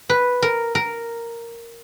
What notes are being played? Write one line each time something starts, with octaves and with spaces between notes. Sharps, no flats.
B4
A#4
A#4